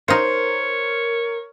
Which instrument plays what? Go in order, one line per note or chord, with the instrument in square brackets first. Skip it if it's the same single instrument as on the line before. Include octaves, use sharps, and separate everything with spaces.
[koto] D#4 F4 [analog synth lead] A#4 [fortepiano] C5 [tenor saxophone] C#5